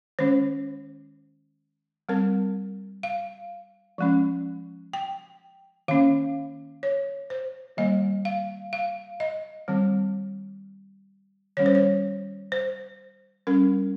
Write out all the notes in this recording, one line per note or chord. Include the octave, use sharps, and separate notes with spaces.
D#3 G#3 C#4 C5
G3 C4 A#4
F5
F3 G#3 C#4
G5
D#3 A#3 C#4 F5
C#5
C5
D#3 G3 A#3 D#5
F5
F5
D#5
D#3 G3 C4
D#3 G3 C#4 C#5
C5
C#5
C5
G3 C#4 A#4